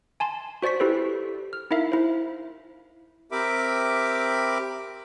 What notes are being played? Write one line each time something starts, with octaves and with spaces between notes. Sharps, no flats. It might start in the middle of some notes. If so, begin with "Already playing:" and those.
G#5 A5 C6
F#4 C5 D5 C#6 B6
E4 G4 A4 B4 C5
F6
D#4 E4 A#4 E5 F5
E4 C5
C4 G4 A#4 E5 B5 D6